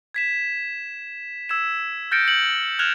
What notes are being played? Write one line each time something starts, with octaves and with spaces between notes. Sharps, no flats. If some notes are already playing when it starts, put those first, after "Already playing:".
G#6 B6 E7
E6 G#6 E7
F6 G6 A6 A#6 C#7 D7
C#7 F#7
F6 F#6 G#6 E7 F7